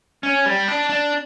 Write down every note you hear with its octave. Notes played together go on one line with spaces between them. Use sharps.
C#4
G3
D4
D4